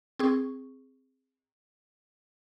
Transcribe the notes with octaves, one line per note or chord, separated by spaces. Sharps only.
C4 G#4 C#6